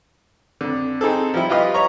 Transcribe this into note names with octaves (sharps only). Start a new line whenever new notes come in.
F2 D3
C4 D#4 G#4 A4
F3 G3 E4
G3 F4 G4 B4 D#5 F5
C#5 D#5 A#5 C#6